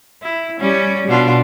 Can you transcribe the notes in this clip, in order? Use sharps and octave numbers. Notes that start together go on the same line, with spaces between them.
E4
G3 C#4
B2 D4 F4